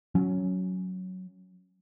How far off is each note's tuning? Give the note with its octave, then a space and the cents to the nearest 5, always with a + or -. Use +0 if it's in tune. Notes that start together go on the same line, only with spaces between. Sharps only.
F#3 +0 C#4 +5